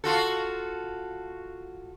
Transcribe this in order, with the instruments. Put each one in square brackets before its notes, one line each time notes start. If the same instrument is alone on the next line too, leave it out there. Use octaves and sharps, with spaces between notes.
[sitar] F4 F#4 A4